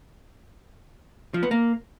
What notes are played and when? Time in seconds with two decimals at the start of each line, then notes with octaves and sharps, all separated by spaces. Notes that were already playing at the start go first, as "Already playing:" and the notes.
1.34 F3
1.43 B3
1.51 A#3